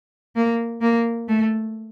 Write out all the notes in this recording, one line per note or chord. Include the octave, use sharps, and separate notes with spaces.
A#3
A#3
A3